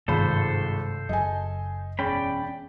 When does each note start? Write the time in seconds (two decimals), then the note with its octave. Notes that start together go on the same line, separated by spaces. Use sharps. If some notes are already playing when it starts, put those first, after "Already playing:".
0.08 G#1 G2 C3 D#3 F4 A4 C5 B5
1.09 F#1 F#3 D#5 G#5
1.99 E1 C#4 D5 G5 B5